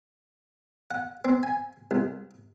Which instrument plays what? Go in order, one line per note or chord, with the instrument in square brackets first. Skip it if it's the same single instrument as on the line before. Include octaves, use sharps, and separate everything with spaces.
[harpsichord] F#5
C4
G#5
C2